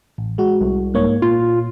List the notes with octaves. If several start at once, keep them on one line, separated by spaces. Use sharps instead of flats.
A1
G#3 F#4
C2
G#2 A#3 C#5
A#2 F4